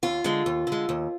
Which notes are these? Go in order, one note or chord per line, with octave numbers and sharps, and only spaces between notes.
D#2 F4
D3 G#3
D#2
D3 G#3
D#2